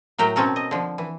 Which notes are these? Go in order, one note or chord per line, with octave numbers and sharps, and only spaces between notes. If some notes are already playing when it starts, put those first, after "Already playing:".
A2 F#3 A#4 E5 G5
B2 C4 C#4 A4 A#4
D#5
D3 F3
E3